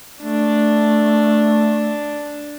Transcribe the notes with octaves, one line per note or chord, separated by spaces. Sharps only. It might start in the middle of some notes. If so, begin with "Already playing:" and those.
A3 D4